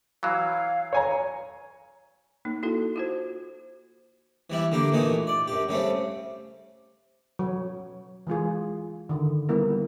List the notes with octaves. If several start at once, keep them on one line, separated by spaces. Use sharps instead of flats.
E3 F#3 F5
C#5 G#5 A#5
A#3 D#4
E4 F#4 A4
F4 F#4 C5
E3 G3 E4
D3 A#3 G4
A#2 E3 A3 D#4
D5
F#2 G4
C#3 G3 A3 C4
F#3 C#5
E3 G#3 F4 G#4
D3 D#3
G3 A#3 B3 E4 A#4